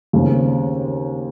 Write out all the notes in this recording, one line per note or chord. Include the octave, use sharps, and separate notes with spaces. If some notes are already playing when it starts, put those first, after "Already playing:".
D#2 C#3 G#3 C4